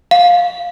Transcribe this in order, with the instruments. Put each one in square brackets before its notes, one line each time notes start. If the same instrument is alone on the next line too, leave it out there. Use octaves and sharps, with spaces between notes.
[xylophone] F5